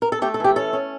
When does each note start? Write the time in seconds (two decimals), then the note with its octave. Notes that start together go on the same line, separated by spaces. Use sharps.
0.02 A#4
0.12 A4
0.22 A3 G4
0.34 A4
0.40 E3 G4
0.56 C#4 A4
0.73 C#4